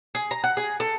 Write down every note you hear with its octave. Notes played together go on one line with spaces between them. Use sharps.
G#4
A#5
F#5
G#4
A4